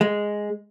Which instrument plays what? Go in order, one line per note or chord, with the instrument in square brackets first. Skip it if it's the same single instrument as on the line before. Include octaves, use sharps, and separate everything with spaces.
[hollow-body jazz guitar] G#3